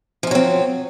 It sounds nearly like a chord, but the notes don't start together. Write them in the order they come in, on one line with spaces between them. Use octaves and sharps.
F3 C#4 F#3 C4